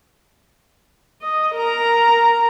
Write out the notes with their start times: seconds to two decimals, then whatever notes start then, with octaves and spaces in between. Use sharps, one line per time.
1.22 D#5
1.56 A#4 A#5